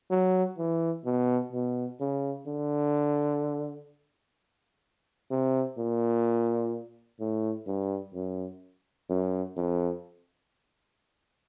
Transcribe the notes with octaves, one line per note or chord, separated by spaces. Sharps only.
F#3
E3
B2
B2
C#3
D3
C3
A#2
A2
G2
F#2
F#2
F2